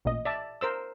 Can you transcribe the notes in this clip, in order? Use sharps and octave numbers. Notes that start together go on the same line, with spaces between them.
A1 A#2 D#5
D5 E5 A5
A#4 C5 E6